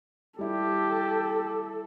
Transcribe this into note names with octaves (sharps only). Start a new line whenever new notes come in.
G3 E4 G4 A4